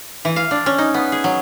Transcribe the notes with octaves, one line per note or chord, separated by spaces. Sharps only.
E3
F5
D4
C#4
D#4
B3
G#4
F#3